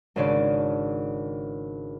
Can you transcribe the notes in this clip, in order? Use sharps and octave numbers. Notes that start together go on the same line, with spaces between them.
G#1 C#3 C#4 D4 D5 D7